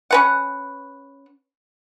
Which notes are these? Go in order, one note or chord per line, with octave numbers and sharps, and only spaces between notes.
C#4 B4 F#5